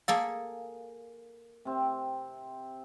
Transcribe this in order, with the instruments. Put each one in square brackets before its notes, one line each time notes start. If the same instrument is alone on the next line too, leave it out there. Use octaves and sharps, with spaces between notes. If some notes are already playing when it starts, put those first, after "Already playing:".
[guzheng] A#3 G#4 A4 [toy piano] F5
[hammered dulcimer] C3 C4